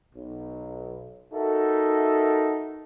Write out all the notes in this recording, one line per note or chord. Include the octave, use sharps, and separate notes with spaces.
B1
D#4 F#4 A4 A#4 E5